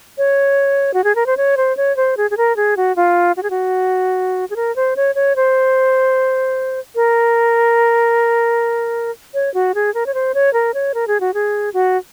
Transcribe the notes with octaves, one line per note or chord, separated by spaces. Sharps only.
C#5
F#4
G#4
A#4
C5
C#5
C5
C#5
C5
G#4
G#4
A#4
G#4
F#4
F4
F#4
G#4
F#4
G#4
A#4
C5
C#5
C#5
C5
A#4
C#5
F#4
G#4
A#4
C#5
C5
C#5
A#4
C#5
A#4
G#4
F#4
G#4
F#4